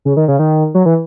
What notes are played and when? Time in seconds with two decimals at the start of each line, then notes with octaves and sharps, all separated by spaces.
0.05 C#3
0.17 D#3
0.28 C#3
0.39 D#3
0.75 F#3
0.86 E3